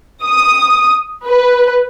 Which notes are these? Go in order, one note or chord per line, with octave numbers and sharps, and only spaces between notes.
D#6
B4